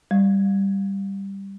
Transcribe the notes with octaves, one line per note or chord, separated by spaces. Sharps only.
G3